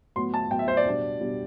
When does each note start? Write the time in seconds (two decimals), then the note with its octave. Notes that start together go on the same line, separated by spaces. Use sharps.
0.16 A2 F#3 B3 C6
0.34 A5
0.51 A2 F#3 B3 G5
0.59 E5
0.68 C5
0.77 D5
0.85 B2 G3 D4
1.21 B2 G3 D4